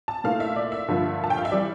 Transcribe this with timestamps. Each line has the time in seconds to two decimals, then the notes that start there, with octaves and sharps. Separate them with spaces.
0.08 A5
0.24 A#2 A3 E4 F5
0.40 E5
0.56 D5
0.72 E5
0.88 G2 D3 F3 A#3 F4
1.24 A5
1.30 G5
1.37 F5
1.45 E5
1.52 E3 G3 D5